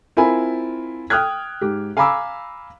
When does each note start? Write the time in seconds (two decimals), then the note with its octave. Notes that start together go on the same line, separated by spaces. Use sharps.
0.17 C4 E4 F4 A#4 G#5 B5
1.10 G5 D#6 F6 F#6 G#6
1.61 G#2 G4
1.97 F5 G#5 A#5 B5 D6 E6